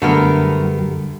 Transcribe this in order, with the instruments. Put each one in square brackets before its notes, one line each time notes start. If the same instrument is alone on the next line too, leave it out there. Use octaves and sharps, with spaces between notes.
[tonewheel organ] F#2 G3 [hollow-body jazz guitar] D3 [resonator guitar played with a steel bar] A3 B3 A#4